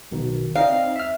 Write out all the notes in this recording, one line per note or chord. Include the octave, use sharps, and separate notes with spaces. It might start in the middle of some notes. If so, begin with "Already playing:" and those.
B1 B2 D#3
C4 D#4 D#5 F5
E5 F6